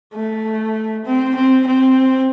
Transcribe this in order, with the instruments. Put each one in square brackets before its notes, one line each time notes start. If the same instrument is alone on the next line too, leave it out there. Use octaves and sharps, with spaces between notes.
[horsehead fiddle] A3
C4
C4
C4